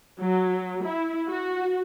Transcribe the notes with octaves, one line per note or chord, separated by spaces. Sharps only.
F#3
E4
F#4